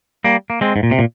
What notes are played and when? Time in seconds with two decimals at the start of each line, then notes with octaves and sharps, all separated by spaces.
0.25 G3 A#3
0.50 A#3
0.61 G#3 C4
0.76 G#2
0.83 A#2
0.91 C3
0.99 A#2